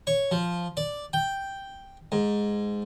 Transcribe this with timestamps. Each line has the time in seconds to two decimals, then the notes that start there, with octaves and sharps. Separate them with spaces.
0.07 C#5
0.31 F3
0.77 D5
1.13 G5
2.12 G#2